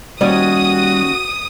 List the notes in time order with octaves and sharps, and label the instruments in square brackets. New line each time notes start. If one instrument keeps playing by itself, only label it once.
[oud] D#2 C#4 D5 [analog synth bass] G3 [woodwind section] F#4 [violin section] D#6